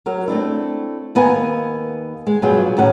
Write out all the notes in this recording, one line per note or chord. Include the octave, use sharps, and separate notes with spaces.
F#3 A#4
A3 C4 D4 E4
D#2 B3 A#4 F5 G#5
G#3
G2 B2 F#3 F4 G#4 G5
A2 D#3 C#4 F#5